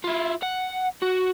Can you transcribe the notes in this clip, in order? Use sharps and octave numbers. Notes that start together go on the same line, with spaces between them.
E4 F4
F#5
F#4